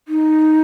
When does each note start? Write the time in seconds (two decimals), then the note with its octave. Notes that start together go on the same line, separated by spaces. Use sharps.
0.08 D#4